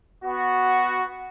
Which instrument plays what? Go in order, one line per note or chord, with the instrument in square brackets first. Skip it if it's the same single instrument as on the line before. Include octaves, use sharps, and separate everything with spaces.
[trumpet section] B3 F#4